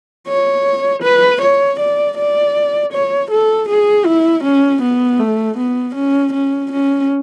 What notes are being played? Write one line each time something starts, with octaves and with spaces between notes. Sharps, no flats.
C#5
B4
C#5
D5
D5
C#5
A4
G#4
E4
C#4
B3
A3
B3
C#4
C#4
C#4